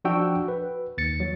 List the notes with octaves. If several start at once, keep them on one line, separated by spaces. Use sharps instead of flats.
F3 D4 F#4 G5 E6
B4
D#2 A6 C#7
F#3